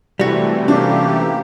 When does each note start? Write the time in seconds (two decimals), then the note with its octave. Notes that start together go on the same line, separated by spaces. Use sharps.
0.19 C3 E3 G3 A3 F#4
0.68 A#3 C#4 D4 G4